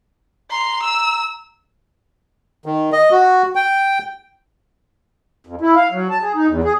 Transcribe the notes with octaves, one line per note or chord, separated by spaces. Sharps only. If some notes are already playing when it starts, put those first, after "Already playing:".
A#5 C6
E6
D#3
D#5
F#4
G5
F2
E4
F5
F#3
A5
G#4
D#4
E2
G#4